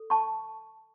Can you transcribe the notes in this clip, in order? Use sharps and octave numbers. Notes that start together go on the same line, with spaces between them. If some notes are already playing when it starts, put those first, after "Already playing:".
Already playing: A4
A5 C#6